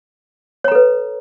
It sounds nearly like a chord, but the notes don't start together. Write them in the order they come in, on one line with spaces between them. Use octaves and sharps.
C#5 A#5 A4 B4